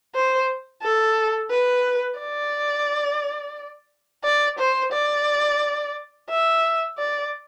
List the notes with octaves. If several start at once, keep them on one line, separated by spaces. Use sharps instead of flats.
C5
A4
B4
D5
D5
C5
D5
E5
D5